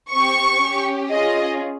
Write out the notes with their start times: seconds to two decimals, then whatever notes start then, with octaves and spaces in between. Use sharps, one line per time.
0.12 C4 G4 C#6
0.62 C#4 G4
1.11 C#4 F4 G#4 D#5